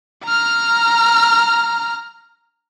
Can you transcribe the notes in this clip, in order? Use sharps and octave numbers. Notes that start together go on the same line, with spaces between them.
A#5 F6